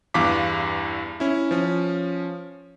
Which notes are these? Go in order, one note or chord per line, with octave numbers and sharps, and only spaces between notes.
E2 G2 E3 F5 D6 B6
C#4 E4
F3 C#4